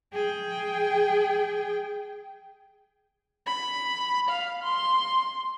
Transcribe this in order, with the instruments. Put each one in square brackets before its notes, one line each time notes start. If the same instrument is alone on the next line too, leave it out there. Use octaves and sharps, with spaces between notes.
[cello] G#4 G5
[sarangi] B5
F5
C6